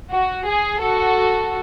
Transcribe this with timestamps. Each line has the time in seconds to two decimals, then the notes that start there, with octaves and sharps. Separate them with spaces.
0.11 F#4
0.46 G#4
0.82 F#4 A4